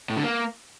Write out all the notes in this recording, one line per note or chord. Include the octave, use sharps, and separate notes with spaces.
A2
D3
A#3